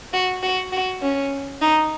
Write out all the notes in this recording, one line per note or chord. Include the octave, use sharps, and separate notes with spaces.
F#4
F#4
F#4
C#4
D#4